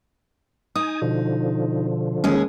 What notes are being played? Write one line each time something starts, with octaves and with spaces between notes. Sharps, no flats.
D#4 G#5 D#6
B2 D3 F3
D#2 G#3 C#4 G#4